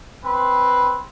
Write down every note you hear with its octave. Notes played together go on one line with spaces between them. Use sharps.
C4 B4 C6